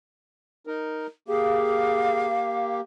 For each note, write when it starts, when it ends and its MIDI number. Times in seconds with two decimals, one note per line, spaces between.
0.67 1.07 63
0.67 1.07 70
1.28 2.81 58
1.28 2.81 67
1.28 2.27 68
1.28 2.76 77